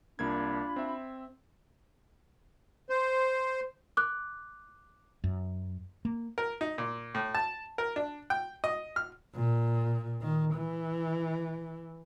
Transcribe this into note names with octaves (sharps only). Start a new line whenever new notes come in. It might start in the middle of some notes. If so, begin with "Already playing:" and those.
C2 A#3 D4 F4 B5 G#6
C4 E5
C5
D6 F#6
F#2
A#3
A#4
D#4
A#2
A2
A5
A#4
D4
G5
D#5
F6
A#2
D#3
E3